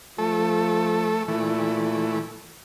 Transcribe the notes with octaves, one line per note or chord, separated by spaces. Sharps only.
F3 A3 A4
A#2 E3 A3